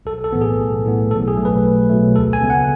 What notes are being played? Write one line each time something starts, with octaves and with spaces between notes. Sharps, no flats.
B1 A4
A4
A2 E3 B3
G#4
B1
A2 E3 B3
B1 A4
G#4
B2 F#3 A3
B4
B1
B2 F#3 A3
D2 A4
G#5
C#3 G#3 B3
F#5